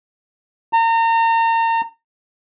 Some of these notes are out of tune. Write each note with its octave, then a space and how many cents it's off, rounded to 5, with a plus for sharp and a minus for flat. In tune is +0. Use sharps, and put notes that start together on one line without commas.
A#5 -35